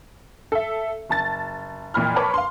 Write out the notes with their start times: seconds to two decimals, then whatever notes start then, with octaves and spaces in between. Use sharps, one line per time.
0.52 A4 E5
1.09 F#1 A5 A6
1.94 F2 A#2 E3 B5 F6
2.16 A#4 B4 C#5 A5 B5 D6
2.34 F5 C6